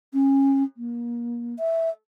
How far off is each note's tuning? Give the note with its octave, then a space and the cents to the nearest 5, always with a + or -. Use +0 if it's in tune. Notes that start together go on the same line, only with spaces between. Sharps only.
C#4 -25
A#3 +30
E5 -5